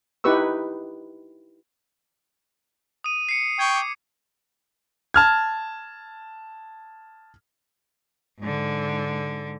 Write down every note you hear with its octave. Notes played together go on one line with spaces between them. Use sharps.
D#4 E4 G4 B4 C#6 E6
D#6 D#7
C7 C#7
G5 C#6 G#6
D6
A5 F6 G#6
G#2 D3